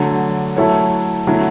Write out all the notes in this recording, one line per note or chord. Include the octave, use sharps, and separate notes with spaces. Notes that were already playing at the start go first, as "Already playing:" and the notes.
Already playing: D3 F#3 A3
F#3 A3 E4 A4 C#5
D3 F#3 A3 E4